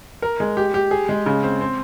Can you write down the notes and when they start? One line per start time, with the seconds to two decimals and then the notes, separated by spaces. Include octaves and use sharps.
0.22 A#4
0.40 G#3
0.57 G4
0.74 G4
0.91 G#4
1.09 G#3
1.26 C#3
1.43 C4
1.61 C4